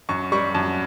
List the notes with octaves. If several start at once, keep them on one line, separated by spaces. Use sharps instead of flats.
F#2 C#6
G3 C#6
F#2 A5